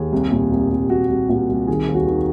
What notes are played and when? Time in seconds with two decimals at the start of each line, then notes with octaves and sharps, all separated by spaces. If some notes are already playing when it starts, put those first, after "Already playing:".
Already playing: D#2 G#4
0.12 C2
0.31 A#2
0.52 C2
0.71 C2
0.90 C2 F#4
1.09 C2
1.29 A#2 F#4
1.49 C2
1.68 D#3 G#4
1.88 D#2
1.94 F#4
2.07 D#3